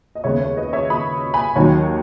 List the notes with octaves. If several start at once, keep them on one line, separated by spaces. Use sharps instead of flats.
D#5
D#2 C#3 G#3 B3 C#5 E5
C#5
B4 D#5
C#5 E5
B5 D#6
G#5 B5
D#2 D#3 F#3 C#5